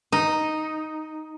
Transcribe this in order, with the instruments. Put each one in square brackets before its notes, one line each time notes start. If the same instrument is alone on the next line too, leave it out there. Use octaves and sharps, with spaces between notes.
[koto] D#4